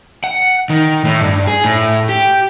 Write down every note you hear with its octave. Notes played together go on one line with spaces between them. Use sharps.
F#5
D#3
A2
G2
G#4
A2
G4